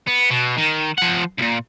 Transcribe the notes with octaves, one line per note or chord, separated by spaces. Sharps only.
B3
B2
D#3
F3 F#5
C#2 A#2